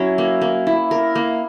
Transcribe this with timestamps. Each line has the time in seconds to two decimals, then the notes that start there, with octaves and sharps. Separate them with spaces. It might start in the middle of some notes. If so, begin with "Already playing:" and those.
Already playing: F#3 C#4 E4
0.18 A#3
0.41 A#3
0.67 E4
0.91 A#4
1.15 A#3